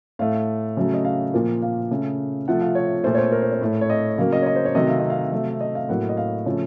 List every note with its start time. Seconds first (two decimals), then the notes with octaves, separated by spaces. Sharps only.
0.19 A2 A3 F5
0.77 C#3 F#3 A3
0.94 D#5
1.05 F5
1.33 A#2 F3 A#3
1.62 F5
1.91 C#3 A3
2.48 C3 F3 A3 F#5
2.61 F5
2.75 C#5
3.04 A#2 A3 C5
3.15 C#5
3.18 C5
3.32 A#4
3.42 C5
3.52 C#5
3.61 A2 A3
3.81 C#5
3.90 D#5
4.18 C#3 F#3 A#3 F5
4.33 D#5
4.42 C#5
4.46 D#5
4.56 C5
4.65 C#5
4.75 C3 D#3 F#3 A3 D#5
4.89 F5
4.99 D#5
5.10 F5
5.31 C3 F#3 A3
5.61 D#5
5.75 F5
5.89 A2 F#3 A#3 F#5
6.09 D#5
6.17 F5
6.46 C#3 F3 A3 C#5